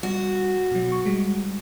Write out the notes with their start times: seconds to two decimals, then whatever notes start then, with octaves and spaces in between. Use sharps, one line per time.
0.03 G3 F#4
0.72 B2 F#3
0.92 C#6
1.05 G3 G#3